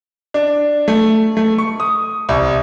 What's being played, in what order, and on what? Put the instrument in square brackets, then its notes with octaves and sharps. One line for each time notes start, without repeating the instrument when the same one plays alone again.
[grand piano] D4
A3
A3
C#6
D#6
C2